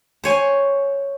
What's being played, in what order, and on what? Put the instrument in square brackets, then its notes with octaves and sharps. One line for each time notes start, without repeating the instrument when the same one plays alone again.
[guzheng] C5 C#5 G#5